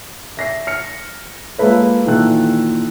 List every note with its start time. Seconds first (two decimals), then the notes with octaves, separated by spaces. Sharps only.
0.37 E5 A#6 C7
0.67 F6 C#7
1.58 G#3 A#3 F4 A4 B4 C#5
2.06 A#2 D#3 E3 A4 F#6